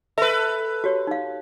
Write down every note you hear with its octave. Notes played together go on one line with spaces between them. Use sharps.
A4 B4 E5
F#4 G4 C#5
D#4 F5